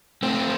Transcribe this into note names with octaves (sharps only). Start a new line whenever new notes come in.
A2 A3 C4